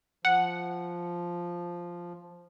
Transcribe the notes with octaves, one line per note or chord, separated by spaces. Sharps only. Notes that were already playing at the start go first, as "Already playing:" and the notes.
F3 F#5